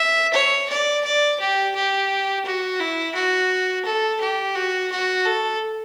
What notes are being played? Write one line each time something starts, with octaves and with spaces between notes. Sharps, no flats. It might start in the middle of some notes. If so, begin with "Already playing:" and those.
Already playing: E5
C#5
D5
D5
G4
G4
F#4
E4
F#4
A4
G4
F#4
F#4
A4